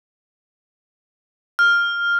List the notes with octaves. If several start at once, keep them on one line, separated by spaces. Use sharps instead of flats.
F6